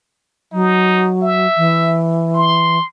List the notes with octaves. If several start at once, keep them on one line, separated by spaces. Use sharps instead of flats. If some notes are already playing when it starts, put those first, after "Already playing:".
F#3 D#4
E5
E3
C6